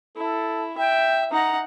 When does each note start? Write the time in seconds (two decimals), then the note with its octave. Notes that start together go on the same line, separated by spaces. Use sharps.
0.16 E4 A4
0.78 E5 G5
1.31 D#4 F#5 A#5